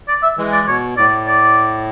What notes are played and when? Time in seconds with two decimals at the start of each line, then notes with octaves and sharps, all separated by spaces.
0.08 D5
0.23 E5
0.37 E3 G#3
0.52 D5
0.67 B2 C#5
0.97 A2 D5
1.27 D5